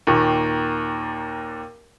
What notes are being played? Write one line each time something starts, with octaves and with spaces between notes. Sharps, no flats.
D#2 A#2 D#3